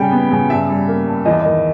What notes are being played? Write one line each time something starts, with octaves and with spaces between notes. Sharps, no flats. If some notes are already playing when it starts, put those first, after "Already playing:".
Already playing: C#3 G3 G5
B3
C#3
G2 E5
G3
A#3
G2
E2 D#5
E5
D#3 D#5